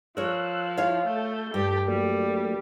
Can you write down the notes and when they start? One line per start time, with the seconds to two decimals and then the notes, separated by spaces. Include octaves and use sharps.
0.17 F3 A#4 C#5 E6 F#6
0.77 E4 C#5 F5
1.06 A3 A4 A5 G6
1.54 G2 G4
1.88 F#3 G3 A3 A#3